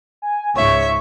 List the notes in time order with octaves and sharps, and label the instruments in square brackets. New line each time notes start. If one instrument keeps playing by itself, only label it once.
[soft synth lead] G#5
[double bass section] C#2 G#2 [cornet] C#5 [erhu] E5 [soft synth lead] C#6